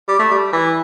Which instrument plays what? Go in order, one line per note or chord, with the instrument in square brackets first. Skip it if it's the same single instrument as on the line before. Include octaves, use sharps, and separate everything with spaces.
[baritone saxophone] G3
A3
G3
E3